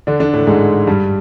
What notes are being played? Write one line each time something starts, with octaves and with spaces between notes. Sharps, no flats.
D3 D4
D3 D4
A2 A3
G#2 G#3
G2 G3